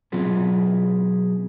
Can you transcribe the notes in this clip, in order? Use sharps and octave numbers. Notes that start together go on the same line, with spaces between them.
B2 F#3 C4 F4 G#4 B4